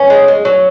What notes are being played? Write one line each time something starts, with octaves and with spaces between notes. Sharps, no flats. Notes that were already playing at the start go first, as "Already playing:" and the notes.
Already playing: C#4 G#5
G#3
G#3
F#3